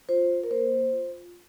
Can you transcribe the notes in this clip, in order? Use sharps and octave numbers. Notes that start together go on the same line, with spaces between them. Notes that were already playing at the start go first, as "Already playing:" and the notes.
F4 C5
A#4
A#3 C5
F4